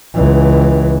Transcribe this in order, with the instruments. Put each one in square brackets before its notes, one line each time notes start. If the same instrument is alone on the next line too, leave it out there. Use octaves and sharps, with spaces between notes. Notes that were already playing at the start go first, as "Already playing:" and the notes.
[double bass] C#2 E3